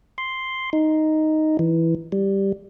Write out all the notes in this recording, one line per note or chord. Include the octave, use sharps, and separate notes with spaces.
C6
D#4
E3
G3